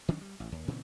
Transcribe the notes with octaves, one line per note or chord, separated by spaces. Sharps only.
D#3 F#3 C#4 D4
G3
A1
D#2
A#2 C#3 E3 C4